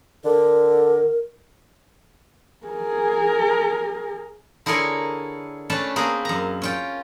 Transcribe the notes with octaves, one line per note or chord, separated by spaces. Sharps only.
D3 A#4
G#4 A#4
D3 E4 G#4 A#4 C#5 C6
A3 C#4 D4 B4 A5
A#3 C4 G#4 B4 A#5
F#2 A#5
C#4 F4 G5